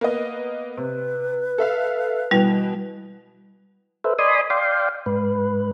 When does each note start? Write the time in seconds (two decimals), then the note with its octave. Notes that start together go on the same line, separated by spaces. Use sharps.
0.01 A#3 B3 D#5
0.77 C3 B4
1.58 A4 E5 F5
2.31 B2 E3 G3 F7
4.04 A4 B4 C5 E5
4.19 D5 D#5 G#5 B5 C6 D#6
4.50 D5 F5 G5 C6
5.06 G#2 B4